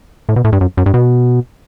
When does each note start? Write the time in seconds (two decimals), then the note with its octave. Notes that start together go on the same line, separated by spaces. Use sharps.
0.29 A2
0.36 B2
0.44 A2
0.53 G2
0.61 F#2
0.77 F#2
0.86 G2
0.94 B2